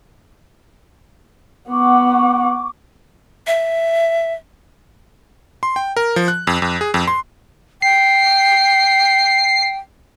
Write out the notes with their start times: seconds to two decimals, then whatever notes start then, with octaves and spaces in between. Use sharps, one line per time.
1.70 B3 F#5 C#6 D6
3.47 E5
5.63 C6
5.76 G5
5.97 A#4
6.16 F3
6.28 F#6
6.47 F2
6.62 F2
6.81 G#4
6.94 F2
7.07 C6
7.82 G5 C7